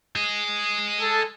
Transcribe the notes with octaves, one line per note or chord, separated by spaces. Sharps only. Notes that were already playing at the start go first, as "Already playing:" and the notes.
G#4 D#5
A4